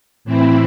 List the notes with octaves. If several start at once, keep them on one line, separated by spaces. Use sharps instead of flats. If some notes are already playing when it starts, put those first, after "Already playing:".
A2 E3 C4 E4